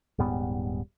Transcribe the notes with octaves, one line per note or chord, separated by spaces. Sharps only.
D#1 G#2 G3 B3